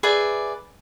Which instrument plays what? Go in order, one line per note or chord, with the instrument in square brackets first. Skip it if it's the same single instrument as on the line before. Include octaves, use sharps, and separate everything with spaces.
[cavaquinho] G#4 B4 D5 E5